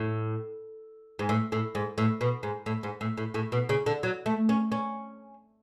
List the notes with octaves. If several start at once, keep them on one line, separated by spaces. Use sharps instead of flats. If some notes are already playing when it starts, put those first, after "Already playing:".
Already playing: A2
G#2
A2
A2
G#2
A2
B2
G#2
A2
G#2
A2
A2
A2
B2
C#3
D3
F#3
A3
C#4
C#4